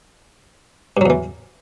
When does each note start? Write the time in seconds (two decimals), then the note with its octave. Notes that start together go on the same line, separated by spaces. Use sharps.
0.97 G2
1.01 F#3
1.06 E2
1.10 E3